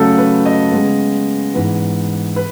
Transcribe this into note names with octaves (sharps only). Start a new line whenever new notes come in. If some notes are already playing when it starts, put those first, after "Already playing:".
Already playing: C#3 F#3 A3 A4
B4
D#5
C#3 G#3 B3
G#2 E3 B3 B4
B4